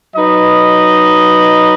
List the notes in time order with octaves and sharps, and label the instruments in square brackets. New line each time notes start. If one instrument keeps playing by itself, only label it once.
[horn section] F#3 D#4 B4 D#5